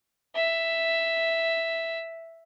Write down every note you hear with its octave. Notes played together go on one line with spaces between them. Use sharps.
E5